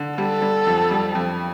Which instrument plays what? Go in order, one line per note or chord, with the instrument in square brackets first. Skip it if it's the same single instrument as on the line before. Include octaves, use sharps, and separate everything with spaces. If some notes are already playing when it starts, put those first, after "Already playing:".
Already playing: [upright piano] D3
[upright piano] G3 [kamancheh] A4
[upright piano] G3
F2
G3
F2